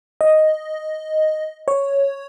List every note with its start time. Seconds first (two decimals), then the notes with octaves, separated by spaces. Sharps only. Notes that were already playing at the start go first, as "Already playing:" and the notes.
0.21 D#5
1.68 C#5